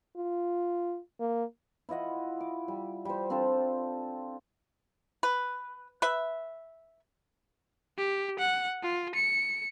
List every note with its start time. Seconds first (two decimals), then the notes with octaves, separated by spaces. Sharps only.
0.17 F4
1.20 A#3
1.89 E4 F4 D#5 F#5
2.40 D6
2.68 G3
3.05 G3 C5
3.30 C4 D4 F4 A4
5.23 B4
6.02 B4 E5
7.98 G4
8.39 F#5
8.82 F4
9.15 C#7